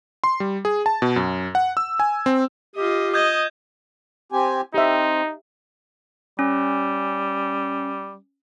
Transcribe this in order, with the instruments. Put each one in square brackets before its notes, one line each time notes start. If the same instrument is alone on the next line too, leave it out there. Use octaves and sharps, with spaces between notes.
[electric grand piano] C6
G3
G#4
A5
B2
F#2
F#5
E6
G#5
C4
[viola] F4 D#5 [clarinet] G4
[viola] D#5 [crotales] D#6 G6 G#6
[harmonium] C4 G4 G#5
[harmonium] C4 [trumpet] D#4 [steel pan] G4 E5
[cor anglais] G3 [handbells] C#4